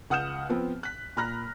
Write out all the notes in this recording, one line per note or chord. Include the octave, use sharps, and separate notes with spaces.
C#2 F#5 D#6 F6 G6 E7
F3 B3 C4
F#6 B6
A#2 A#5 B5 F6 F#6 A#6